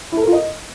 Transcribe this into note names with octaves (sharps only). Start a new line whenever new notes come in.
E4
A4
A#4
F4
D#5